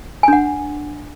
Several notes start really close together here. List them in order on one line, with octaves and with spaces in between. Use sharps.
G#5 D4 F#5